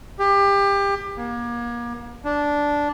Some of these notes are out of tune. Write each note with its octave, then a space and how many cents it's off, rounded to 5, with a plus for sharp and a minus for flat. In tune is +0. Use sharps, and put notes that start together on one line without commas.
G4 +25
A#3 +35
D4 -10